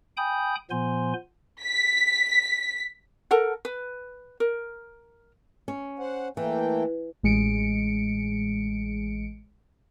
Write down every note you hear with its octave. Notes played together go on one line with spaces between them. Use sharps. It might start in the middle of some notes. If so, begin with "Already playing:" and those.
G5 G#5 B5 D#6 G6
A#2 F3 B3 C5 G#5 C6
B6
A4 A#4 F#5
B4
A#4
C#4
C5 F#5
E3 A3 A#3 G5
A1 G#3 C#7 D7